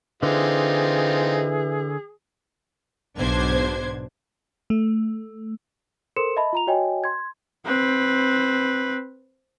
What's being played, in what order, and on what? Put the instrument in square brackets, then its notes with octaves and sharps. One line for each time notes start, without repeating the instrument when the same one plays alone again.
[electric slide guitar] D3 [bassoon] E3 [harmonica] C4 D#4 F4 [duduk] G#4
[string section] B1 G#2 B2 D4 C5 G#6
[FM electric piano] A3
[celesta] A4 A#4 C5 C6 C#7 E7
D#5 E5 A5 B5
F4 A#5 F7
F#4 C#5 D#5 G5 G#5
C6 G#6
[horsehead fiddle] C4 B4